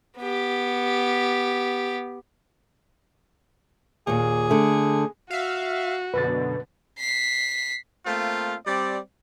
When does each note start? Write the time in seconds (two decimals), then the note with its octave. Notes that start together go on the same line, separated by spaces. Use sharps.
0.19 B3 G4
4.07 D#2 A#2 G#4
4.50 D3 A3
5.31 F#4 E5 F5
6.14 F#2 B2 D3 B4 A6
6.99 B6 C7
8.05 A3 A#3 C4 F4
8.66 G3 C4 D5